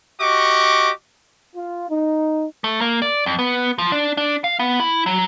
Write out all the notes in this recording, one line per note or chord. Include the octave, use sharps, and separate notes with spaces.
F#4 G4 D#5 C#6 D6
F4
D#4
A3
A#3
D5
F2
B3
F3
D4
D4
F5
B3
E4
F#3